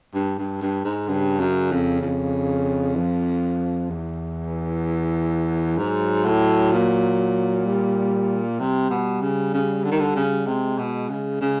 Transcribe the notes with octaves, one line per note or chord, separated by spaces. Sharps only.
G2
G2
G2
G#2
G2 C#3
F#2
F2
F2
F3
E2 E3
G#2 F#3
A2
A#2
G3
C3 G3
B2
C#3
C#3
D3
D#3
D3
C#3
C3 G#3
B2
C#3
C#3